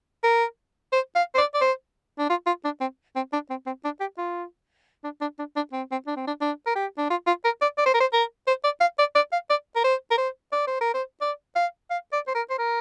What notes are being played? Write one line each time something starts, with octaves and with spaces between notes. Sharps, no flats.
A#4
C5
F5
C5
D5
D5
C5
D4
F4
F4
D4
C4
C4
D4
C4
C4
D4
G4
F4
D4
D4
D4
D4
C4
C4
D4
C4
D4
D4
A#4
G4
D4
F4
F4
A#4
D5
D5
C5
A#4
C5
A#4
C5
D5
F5
D5
D5
F5
D5
A#4
C5
A#4
C5
D5
C5
A#4
C5
D5
F5
F5
D5
C5
A#4
C5
A#4